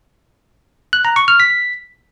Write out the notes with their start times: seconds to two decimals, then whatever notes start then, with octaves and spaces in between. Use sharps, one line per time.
0.93 F#6
1.05 A#5
1.16 C#6
1.28 F6
1.40 B6